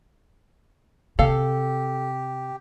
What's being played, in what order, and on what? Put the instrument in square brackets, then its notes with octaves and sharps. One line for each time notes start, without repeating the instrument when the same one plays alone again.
[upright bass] C3 [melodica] G4 [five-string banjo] A4 F5